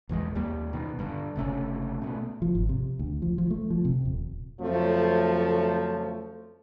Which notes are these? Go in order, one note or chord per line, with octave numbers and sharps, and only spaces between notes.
B1 E2 E3 G#3
D#2 G3 A#3
B2 D#3
G2 D3
F#1 C3 A3 C#4
B2 A3 B3
F3
G#1
C3
D2
F3
F3
A3
F3
C3
D#1
F2 C#3 F3 F#3 A3